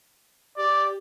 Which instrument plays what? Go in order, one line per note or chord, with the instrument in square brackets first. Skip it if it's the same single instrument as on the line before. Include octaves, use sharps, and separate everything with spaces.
[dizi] G4 [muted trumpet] D5